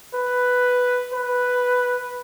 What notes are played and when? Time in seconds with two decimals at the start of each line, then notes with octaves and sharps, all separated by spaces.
0.14 B4
1.13 B4